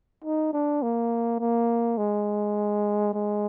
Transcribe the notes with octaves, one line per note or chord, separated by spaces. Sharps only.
D#4
D4
A#3
A#3
G#3
G#3